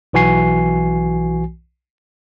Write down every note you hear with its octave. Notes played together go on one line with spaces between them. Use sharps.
B1 E3 F#4 G#5 C7